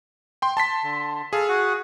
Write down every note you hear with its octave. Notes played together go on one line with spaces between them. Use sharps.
G5 C6
A5 C6 B6
D3
G#4 A4 F5
F#4 F#5